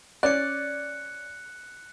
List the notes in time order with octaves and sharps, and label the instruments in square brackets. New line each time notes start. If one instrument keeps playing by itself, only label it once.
[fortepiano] C#4 D5 [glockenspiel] F#6 C#7